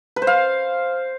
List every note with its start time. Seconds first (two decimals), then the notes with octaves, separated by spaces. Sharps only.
0.16 B4
0.22 C5
0.27 F5